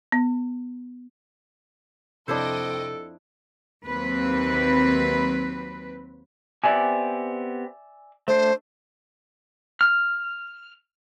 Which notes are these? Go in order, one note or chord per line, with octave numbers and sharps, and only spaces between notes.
B3
F2 C3 D4 E4 A4 C5 D#5 G5
D#2 F#3 C4 B4
B3 C4 G4 D5 E5 G#5
A3 D4 C5
F6